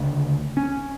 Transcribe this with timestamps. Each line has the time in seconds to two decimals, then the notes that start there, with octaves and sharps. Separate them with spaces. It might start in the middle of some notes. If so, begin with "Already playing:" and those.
Already playing: D2 C#3
0.57 C#4